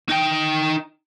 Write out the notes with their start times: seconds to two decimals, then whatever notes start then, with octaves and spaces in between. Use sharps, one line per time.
0.09 D#4 G5